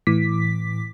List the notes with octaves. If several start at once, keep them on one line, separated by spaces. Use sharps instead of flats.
A2 E3 D6 B6